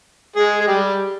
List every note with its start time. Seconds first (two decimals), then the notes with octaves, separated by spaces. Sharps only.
0.36 G#3 G#4
0.61 G#4
0.67 G3 G4